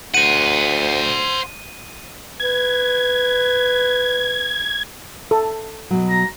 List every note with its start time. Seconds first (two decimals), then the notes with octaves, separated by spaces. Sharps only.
0.14 D2 C5 F#5 D#7
2.40 B4 G#6
5.31 A4
5.91 B2 F#3
6.10 A#5